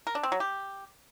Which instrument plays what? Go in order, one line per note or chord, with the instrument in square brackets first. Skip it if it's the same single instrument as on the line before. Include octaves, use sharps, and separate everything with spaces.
[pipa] A#4
D4
C4
F#3
G4